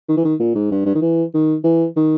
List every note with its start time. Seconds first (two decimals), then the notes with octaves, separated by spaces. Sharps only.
0.08 D#3
0.17 E3
0.24 D#3
0.39 A#2
0.55 G#2
0.71 G2
0.85 G2
0.95 D#3
1.01 E3
1.34 D#3
1.64 E3
1.96 D#3